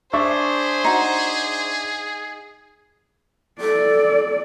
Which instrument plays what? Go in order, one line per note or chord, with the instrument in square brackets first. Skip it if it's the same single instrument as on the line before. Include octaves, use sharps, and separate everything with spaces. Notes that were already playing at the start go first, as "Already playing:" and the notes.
[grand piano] D4 E5 C#6 [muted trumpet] G#4 [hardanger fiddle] C5
[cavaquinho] D#4 F#4
[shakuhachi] A4 [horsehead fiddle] D5